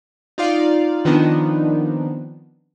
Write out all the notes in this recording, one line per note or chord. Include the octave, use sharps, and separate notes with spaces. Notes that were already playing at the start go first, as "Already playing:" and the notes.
D#4 F4 D5 F5
D#3 F3 B3 C4 D4 D#4